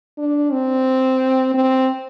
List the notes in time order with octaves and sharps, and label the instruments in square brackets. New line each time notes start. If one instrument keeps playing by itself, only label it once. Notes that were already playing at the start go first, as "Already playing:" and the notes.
[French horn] D4
C4
C4